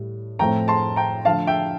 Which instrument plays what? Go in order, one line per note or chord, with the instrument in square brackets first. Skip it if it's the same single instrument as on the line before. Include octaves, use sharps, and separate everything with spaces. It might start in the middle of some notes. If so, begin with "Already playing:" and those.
Already playing: [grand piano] A2 G3
A2 F3 A3 C4 G5 A#5
A5 C6
G5 A#5
D3 F3 A3 F5 A5
E5 G5